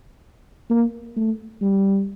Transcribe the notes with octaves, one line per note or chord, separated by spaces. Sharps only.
A#3
A3
G3